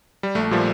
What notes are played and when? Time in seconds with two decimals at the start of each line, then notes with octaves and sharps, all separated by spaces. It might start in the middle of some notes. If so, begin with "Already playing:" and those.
0.23 G3
0.35 A#1 A3
0.51 A#2 F3 G3